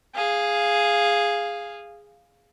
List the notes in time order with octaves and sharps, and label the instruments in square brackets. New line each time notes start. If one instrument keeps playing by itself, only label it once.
[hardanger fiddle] G#4 F5